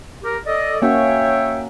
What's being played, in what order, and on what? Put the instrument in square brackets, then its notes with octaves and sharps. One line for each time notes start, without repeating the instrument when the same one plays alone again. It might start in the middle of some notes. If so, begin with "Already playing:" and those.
[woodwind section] G4 A#4
A4 D5 D#5
[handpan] A#3 C#4 F#4 [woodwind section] C#5 E5 G5